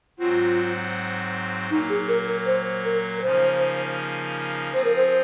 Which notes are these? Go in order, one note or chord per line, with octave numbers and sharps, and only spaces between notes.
G#2 F#3 C4 F4 F#4
A#2 F#3 A#3 D#4
G#4
A#4
A#4
C5
A#4
A#4
C#3 F3 A#3 D#4 C5
F3 C4 F4 G#4 C5
A#4
C5